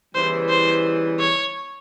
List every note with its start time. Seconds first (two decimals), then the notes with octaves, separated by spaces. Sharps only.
0.15 C#3 E3 G3 B3 E4 C5
0.49 C5
1.20 C#5